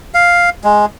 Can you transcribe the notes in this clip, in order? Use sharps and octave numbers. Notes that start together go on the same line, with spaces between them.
F5
G#3